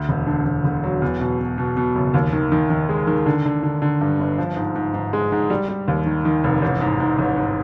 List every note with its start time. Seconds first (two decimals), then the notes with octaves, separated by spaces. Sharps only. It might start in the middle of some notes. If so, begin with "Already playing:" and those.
Already playing: D2
0.09 E1
0.27 D3
0.45 E1
0.64 E1
0.84 F#3
1.02 E2
1.20 B2
1.39 B2
1.58 B2
1.77 B2
1.95 F#1
2.14 D#2
2.33 D#3
2.52 D#3
2.70 D#3
2.89 G#3
3.07 D#3
3.26 D3
3.45 D3
3.63 D3
3.82 D3
4.01 G2
4.19 G1
4.38 F3
4.57 G#2
4.76 G#2
4.94 G#2
5.13 G#3
5.32 G#2
5.50 G3
5.68 G3
5.88 D#2
6.06 D#3
6.25 D#3
6.44 F1
6.62 A1
6.81 G#2
7.00 G#2
7.19 A1
7.37 G#2